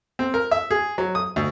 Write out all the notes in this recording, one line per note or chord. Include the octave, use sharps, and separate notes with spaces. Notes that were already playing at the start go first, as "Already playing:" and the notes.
C4
A#4
E5
G#4
F#3
D#6
D2